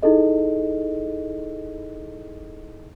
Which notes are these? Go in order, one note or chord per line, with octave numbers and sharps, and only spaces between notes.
D#4 E4 G#4 A4 D#5